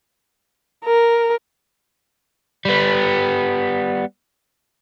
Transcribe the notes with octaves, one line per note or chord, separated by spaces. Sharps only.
A#4
G3 B3